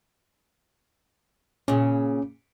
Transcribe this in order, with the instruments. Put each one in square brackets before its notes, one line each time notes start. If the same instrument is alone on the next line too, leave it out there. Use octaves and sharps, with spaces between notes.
[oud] A#2 C#3 [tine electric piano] C#4